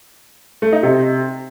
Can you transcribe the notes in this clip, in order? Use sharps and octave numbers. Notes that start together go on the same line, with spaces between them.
A3
D#4
C3